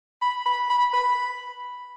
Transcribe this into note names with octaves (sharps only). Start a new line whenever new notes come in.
B5
B5
B5
B5